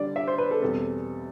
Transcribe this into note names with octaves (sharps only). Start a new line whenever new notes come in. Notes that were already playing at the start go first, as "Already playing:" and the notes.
Already playing: D3 G3 D4 D5
E5
C5
B4
A4
E2 B2 G3 C4 A4